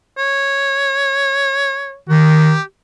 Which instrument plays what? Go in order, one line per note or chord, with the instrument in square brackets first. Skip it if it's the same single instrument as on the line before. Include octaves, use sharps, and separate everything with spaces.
[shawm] C#5
[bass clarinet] D#3 [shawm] G4